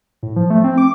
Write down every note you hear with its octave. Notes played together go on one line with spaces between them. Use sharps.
A2
F3
A3
C4
D6